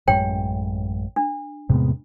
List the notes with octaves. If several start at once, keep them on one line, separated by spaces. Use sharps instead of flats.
A1 F#2 G#3 C#5 G5
D4
E2 A2 C3 G#3 B3